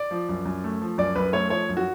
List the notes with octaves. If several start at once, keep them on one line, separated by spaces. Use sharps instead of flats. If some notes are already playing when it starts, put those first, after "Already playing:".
Already playing: D5
F3
F#2
F#2
A3
F3
F#2 D5
F#2 B4
A3 C#5
F3 C#5
F#2
F#4